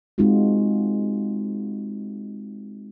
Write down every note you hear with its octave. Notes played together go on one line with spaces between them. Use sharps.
G#3 C4 D#4 F4 F#4